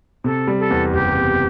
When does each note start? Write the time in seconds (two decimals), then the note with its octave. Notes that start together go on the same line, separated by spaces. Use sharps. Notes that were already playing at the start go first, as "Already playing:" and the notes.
0.24 C3 A4
0.47 G3
0.59 A4
0.71 E2
0.93 F#1 G4
1.15 C3